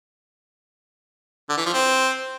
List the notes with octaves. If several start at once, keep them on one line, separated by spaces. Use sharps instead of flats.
D3
E3
F3
C4